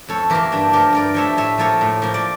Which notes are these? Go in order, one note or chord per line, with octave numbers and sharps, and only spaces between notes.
F2 A4 C#5
E3 A#3 G4 A#4
G2 D4
F3 A3 G4 A#4
G2 A#4 D5
F3 A3 C#5 E5
A2 C#5 E5
F3 A#3 A4 C#5
A2
F3 A#3
D5